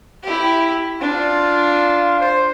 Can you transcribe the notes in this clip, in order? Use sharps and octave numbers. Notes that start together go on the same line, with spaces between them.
E4 G4
D4 F4
C5